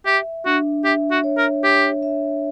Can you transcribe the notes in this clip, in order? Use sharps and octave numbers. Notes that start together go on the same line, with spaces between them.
G4 E5
D4 F#4
G4 E5
F#4
C#5
A#4
G4 C#5
E5